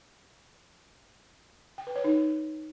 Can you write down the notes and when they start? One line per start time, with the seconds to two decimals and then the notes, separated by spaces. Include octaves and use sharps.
1.78 G5
1.87 B4
1.96 C#5
2.04 D#4